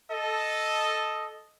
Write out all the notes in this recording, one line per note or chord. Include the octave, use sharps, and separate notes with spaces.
A4 D#5